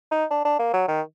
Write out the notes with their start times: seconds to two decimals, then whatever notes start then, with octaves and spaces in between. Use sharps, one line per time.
0.11 D#4
0.31 D4
0.45 D4
0.59 A#3
0.74 F#3
0.88 D#3